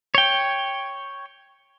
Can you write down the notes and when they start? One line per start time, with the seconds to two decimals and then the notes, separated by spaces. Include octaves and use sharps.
0.15 C#5 G5